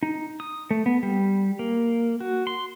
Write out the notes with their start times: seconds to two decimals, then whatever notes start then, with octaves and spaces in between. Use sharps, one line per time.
0.03 D#4
0.40 D#6
0.71 A3
0.86 B3
1.03 G3
1.59 A#3
2.20 F#4
2.47 C6